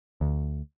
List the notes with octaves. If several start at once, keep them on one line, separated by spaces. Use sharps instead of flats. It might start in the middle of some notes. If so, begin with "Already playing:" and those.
D2